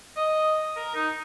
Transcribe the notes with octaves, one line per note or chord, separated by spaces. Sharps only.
D#5
A#4
D#4